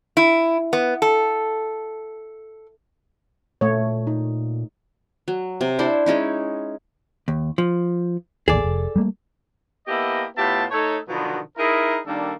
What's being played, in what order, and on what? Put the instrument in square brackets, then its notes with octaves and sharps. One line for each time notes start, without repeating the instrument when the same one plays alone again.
[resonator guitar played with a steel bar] E4
B3
A4
[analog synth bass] A#2 [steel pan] A3 C#5
[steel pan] D#4
[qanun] F#3
C3
D4 E4 C5 D5
G#3 C#4 D#4 E4
[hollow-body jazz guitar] D#2
F3
[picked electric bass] A1 D#2 [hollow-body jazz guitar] G#4 A4 D5
[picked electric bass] F1
G3 A3 A#3
[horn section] A#3 B3 E4 G4 A4 D#5
A2 B3 F4 G4 E5 A5
A3 D#4 A4 C#5
B2 D3 D#3 F3 F#3 B3
D#4 E4 G#4 A#4
D#3 G3 A#3 D4 A4